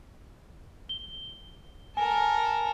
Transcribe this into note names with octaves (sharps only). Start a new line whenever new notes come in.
G7
A4 A#4 G#5